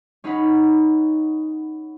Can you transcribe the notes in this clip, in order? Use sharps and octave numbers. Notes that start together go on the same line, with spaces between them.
C#4 D#4 G#4 C#5 F#5 B5